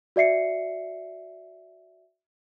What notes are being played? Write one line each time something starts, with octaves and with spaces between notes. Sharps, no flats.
F#4 D5 E5 C7 C#7